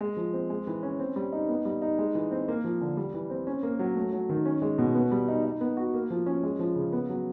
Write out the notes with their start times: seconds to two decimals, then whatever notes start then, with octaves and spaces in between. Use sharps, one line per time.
0.01 G#3
0.17 F3
0.33 C4
0.50 G#3
0.67 E3
0.83 C#4
1.00 C4
1.16 G3
1.32 D#4
1.49 B3
1.65 G3
1.82 D#4
1.99 G#3
2.15 E3
2.31 C4
2.48 A#3
2.64 F3
2.81 D3
2.97 G3
3.14 E3
3.30 C4
3.47 C#4
3.63 A#3
3.79 F#3
3.96 A3
4.13 F#3
4.29 D#3
4.46 C#4
4.62 G#3
4.78 B2
4.95 B3
5.12 G3
5.28 D#4
5.45 D#4
5.61 B3
5.77 F#4
5.94 A#3
6.10 F3
6.26 C#4
6.43 G#3
6.59 F3
6.76 C#3
6.92 B3
7.09 F#3